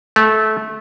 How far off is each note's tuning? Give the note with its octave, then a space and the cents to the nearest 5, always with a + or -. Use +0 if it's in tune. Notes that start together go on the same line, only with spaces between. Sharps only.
A3 -20